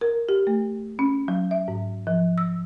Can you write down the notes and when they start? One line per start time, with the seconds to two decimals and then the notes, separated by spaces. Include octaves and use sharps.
0.01 A#4
0.29 G4
0.47 A3
0.99 C#4
1.28 F#3
1.51 E5
1.68 G#2
2.07 F3
2.38 E6